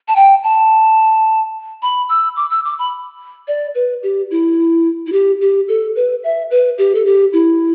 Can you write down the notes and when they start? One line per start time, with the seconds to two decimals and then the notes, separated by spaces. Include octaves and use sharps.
0.08 A5
0.16 G5
0.44 A5
1.82 B5
2.09 E6
2.36 D6
2.50 E6
2.65 D6
2.79 B5
3.48 D5
3.75 B4
4.03 G4
4.31 E4
5.07 E4
5.12 G4
5.41 G4
5.68 A4
5.96 B4
6.24 E5
6.51 B4
6.78 G4
6.95 A4
7.06 G4
7.33 E4